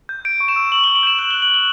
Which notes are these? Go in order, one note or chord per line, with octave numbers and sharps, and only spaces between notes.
G6
G6 D7
C#6
E7
E6
C#6 F#7
G7
C#6
F#7
G6 E7
F#6 F#7
G7
F#6
F#7
F#6 G7